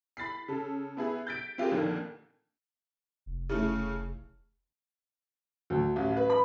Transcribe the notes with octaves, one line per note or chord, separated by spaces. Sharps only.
B5 A6 B6 C7
C#3 A4
B3 E4 G#4
G6 A6 B6 D7
C4 F4 G4 G#4 A#4
F2 A#2 D3 D#3 A#3
F1
C#3 E3 A3
D2
A1
B4
B5